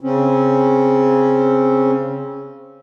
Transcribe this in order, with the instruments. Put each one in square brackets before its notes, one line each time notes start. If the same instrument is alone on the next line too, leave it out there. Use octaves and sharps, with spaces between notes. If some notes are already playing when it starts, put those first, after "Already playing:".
[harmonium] C#3 C4 C#4